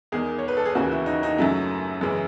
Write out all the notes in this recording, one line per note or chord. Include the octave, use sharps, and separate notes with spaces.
E2 D#3 G#3 G#4
C#5
B4
A4
G#4
D#2 C#3 E3 F#4
E4
D#4
D#4
F#2 C#3 F#3 A3 E4
F#2 C#3 E3 G#3